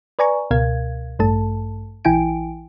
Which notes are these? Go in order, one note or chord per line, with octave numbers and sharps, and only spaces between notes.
B4 D5 G#5 A#5 C#6
C#2 B2 A#4 F5 G#6
A1 G2 A3 A4 A5
A#1 E3 E4 G5 G#5 D7